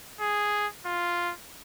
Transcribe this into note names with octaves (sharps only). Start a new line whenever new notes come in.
G#4
F4